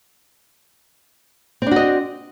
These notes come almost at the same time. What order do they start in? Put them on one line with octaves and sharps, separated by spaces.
C4 D4 F#4 D#5